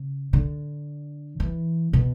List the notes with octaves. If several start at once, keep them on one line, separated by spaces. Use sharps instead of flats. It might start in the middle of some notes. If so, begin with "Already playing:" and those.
Already playing: C#3
D3
E3
B2